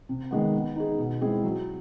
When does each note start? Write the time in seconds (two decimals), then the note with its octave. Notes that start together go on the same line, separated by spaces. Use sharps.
0.09 C3
0.31 D#3 G#3 B3
0.53 B3
0.76 D#4 G#4
0.98 B2
1.21 G#3 C4 E4 G#4
1.44 F#3